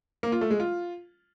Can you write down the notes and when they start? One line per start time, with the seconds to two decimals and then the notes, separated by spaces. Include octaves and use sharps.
0.23 A#3
0.32 F4
0.41 A3
0.51 G#3
0.60 F4